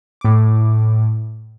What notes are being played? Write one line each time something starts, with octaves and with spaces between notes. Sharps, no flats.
A2 D6